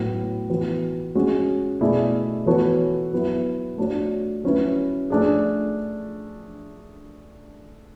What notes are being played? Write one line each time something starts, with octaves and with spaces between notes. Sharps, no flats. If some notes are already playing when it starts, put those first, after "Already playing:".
Already playing: A2 F#3 B3
E3 B3 F#4
G#3 C#4 F#4
B2 A3 E4 G#4 D5
E3 B3 F#4 A4 C#5
F#3 B3 E4
A3 D4 F#4 C#5
F#3 C#4 E4 B4
A3 D4 G#4